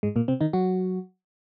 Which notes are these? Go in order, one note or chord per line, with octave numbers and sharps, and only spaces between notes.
G#2 G#3
A#2 A#3
C3 C4
D#3 D#4
F#3 F#4